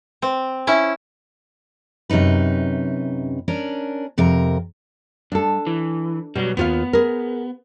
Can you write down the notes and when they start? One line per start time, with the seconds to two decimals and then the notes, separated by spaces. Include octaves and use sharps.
0.22 C4
0.67 C#4 E4
2.10 F#2 C3 C#4 D#4 B4
3.48 C#4 D4 A#4
4.18 F2 C3 A#4
5.32 G2 D4 A4
5.67 E3
6.36 B2 F#3 G3
6.57 D#2 B3 F4 F5
6.93 G#4 A#4